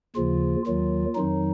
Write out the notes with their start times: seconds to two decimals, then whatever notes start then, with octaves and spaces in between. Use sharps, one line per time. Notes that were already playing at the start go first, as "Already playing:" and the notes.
0.16 D#2 C#3 F3 F4
0.66 D#2 D#3 F#3 F4
1.15 F2 D#3 F#3 D#4